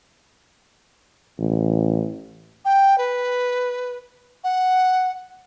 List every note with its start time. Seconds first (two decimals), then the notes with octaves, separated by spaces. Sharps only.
1.39 A1
2.65 G5
2.98 B4
4.44 F#5